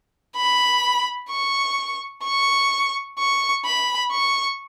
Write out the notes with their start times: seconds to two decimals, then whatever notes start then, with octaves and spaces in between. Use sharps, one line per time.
0.36 B5
1.30 C#6
2.24 C#6
3.19 C#6
3.65 B5
4.11 C#6